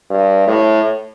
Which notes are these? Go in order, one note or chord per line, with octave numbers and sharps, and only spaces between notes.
G2
A2